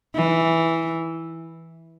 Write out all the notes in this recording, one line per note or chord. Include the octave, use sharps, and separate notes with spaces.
E3